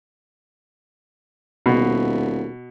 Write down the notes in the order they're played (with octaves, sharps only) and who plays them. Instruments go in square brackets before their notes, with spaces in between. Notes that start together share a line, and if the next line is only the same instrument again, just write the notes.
[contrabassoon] D#1 [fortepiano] B2